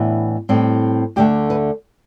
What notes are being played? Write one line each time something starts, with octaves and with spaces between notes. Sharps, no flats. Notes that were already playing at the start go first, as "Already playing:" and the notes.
Already playing: A2 E3 B3 D4
A2 G3 C4
D2 D3 A3 G4
B4